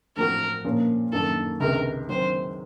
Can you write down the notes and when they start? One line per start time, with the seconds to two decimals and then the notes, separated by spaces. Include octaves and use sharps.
0.17 A1 A2 F3 C4 F#4 A#4
0.64 A#2 F3 A#3 C#4 F4
1.12 F#2 D#3 A#3 D#4 A4
1.60 C#2 C3 D#3 A#4
2.09 D#3 F#3 C4 C5